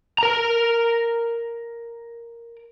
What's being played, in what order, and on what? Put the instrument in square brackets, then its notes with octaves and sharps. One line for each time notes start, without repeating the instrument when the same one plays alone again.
[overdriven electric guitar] A#4 A#5